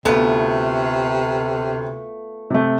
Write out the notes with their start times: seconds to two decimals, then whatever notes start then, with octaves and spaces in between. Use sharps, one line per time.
0.05 D2 C3 A3 B3 F4
2.50 C3 A3